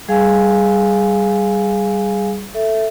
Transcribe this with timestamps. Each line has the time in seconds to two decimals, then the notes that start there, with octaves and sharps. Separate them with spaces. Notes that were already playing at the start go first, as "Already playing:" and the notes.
0.08 G3 G#4 F5 G#5
2.54 A4 E5